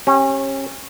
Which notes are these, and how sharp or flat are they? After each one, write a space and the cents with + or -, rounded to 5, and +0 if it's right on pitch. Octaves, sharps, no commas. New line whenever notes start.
C#4 -30 G4 +0